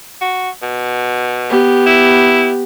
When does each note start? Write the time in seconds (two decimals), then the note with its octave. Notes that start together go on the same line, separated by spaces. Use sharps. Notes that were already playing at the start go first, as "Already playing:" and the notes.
0.21 F#4
0.62 B2
1.50 B3 G4
1.86 E4